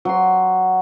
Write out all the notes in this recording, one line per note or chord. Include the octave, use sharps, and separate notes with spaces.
F#3 C6